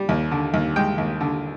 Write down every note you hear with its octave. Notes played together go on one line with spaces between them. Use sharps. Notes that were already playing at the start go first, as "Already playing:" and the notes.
Already playing: G3
D#2
D3
D#2
G#3 G5
D#2
D3